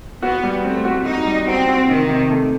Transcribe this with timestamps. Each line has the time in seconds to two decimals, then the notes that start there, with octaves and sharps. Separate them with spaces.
0.23 B3 F#4
0.43 G3
0.64 A3 C4
0.85 F#4
1.05 D#4 F#4
1.26 G3
1.47 C4 F#4
1.68 F#4
1.89 C3 D#3
2.09 C3
2.30 A3